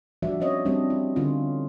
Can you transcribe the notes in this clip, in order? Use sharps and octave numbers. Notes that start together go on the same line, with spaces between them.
F3 G3 D4 F#4 D5 E5
F3 C4 C#4 C#5 D#5
G3 C4 D4
E4
D3 C#4 F4